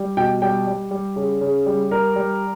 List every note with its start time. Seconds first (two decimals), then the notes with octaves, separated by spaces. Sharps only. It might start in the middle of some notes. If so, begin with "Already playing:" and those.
Already playing: G3
0.17 B2 G5
0.42 G3 G5
0.67 G3
0.91 G3
1.16 C#3
1.41 C#3
1.66 G3
1.91 G3 A#4
2.16 G3